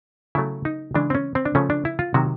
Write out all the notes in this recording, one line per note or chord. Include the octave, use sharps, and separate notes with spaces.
C#3 F#3 A3 E4
D#4
C#3 E3 G#3 D4
C4
C#4
C4
D4
C#3 F3 A3 C#4
D4
E4
F4
C3 D#3 F#3 F#4